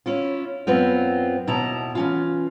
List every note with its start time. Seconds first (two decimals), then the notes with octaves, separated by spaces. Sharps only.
0.06 C#4 E4 F4
0.67 F#2 B3 C4 F4
1.47 D#2 B2 E4 A5 A#5
1.95 E3 C#4 F4